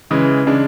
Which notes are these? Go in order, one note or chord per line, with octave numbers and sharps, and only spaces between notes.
C#3 E3 G#3
C#3 G#3 D4